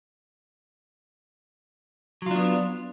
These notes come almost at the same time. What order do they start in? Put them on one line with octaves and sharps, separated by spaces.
F#3 F4 D4 B3